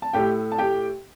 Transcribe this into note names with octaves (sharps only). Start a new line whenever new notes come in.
A5
A2 A3 G4 G5
A5
G4 G5